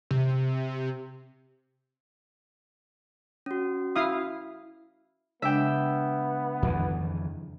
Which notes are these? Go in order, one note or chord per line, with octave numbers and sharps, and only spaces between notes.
C3
C#4 F#4
E4 F5 D#6
C#3 G#3 B3 D4 E5 G5
F2 D#3 E3